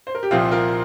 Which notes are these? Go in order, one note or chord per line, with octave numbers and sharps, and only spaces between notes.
C5
A#4
G4
C2 A#2 F3 C4 F4
F4 A#4